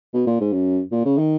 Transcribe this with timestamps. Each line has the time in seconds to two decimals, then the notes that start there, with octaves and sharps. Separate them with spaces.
0.14 B2
0.27 A#2
0.41 G#2
0.53 F#2
0.92 A#2
1.05 C#3
1.18 D#3